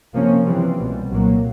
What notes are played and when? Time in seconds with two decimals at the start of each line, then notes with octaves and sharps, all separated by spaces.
0.14 C3 F3 A#3 C#4
0.46 C3 E3 G3 C4
0.79 C2 B2 G3
1.10 C2 A#2 F#3 A#3